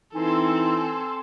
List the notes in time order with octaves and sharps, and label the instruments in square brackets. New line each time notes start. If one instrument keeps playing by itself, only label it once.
[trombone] E3 [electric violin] C4 A4 [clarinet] D#4 [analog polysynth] G#5 C6 E6